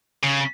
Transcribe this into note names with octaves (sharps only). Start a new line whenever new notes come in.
C#3